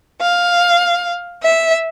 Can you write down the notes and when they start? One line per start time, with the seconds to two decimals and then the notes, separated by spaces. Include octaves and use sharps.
0.19 F5
1.41 E5